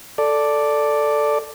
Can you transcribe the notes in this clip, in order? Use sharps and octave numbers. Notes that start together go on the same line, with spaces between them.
A4 D5